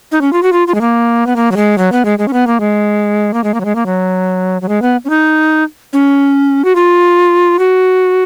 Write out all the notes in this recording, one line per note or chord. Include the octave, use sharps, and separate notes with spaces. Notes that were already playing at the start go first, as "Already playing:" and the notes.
D#4
C#4
F4
F#4
F4
F4
G#3
A#3
B3
A#3
F#3
G#3
F#3
B3
G#3
G#3
C#4
B3
A#3
G#3
A#3
G#3
A#3
F#3
G#3
A#3
F#3
F#3
G#3
B3
C#4
D#4
C#4
F#4
F4
F#4